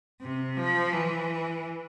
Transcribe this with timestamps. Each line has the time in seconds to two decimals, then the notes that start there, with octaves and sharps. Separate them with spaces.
0.21 C3
0.57 F3
0.93 E3